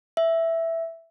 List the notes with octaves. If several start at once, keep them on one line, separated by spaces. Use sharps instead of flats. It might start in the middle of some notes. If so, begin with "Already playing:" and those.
E5